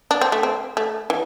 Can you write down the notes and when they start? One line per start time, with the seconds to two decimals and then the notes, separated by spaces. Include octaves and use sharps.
0.11 D4
0.21 C4
0.32 A3
0.43 C4
0.77 A3
1.10 E3